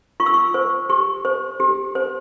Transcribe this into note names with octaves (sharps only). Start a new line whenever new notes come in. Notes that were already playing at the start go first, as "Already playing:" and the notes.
F4 C#6
E6
C#6
C5
G4 C#6
C5
G4
C5